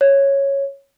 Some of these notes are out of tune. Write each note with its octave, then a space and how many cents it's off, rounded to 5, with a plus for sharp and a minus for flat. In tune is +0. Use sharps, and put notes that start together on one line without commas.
C#5 -5